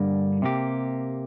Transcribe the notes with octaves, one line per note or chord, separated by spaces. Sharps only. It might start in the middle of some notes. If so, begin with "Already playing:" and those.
Already playing: G2 D3 G3 A#3
C3 A#3 G4